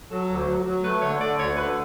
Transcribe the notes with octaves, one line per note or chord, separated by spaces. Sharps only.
F#3 A4
D2
F#3
F#3
A3 B4
D3 C#5
D3 D5
D2 C#5
D3 B4